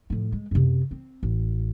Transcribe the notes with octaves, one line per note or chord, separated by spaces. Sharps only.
A2 F3
G#3
F#2 C3
C4
A1